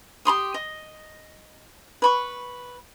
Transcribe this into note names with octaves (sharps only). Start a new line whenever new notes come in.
G4 B5 C6 D#6
D#5
B4 B5 C#6